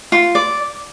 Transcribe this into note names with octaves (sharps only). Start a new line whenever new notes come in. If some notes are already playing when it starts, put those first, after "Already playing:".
F4
D5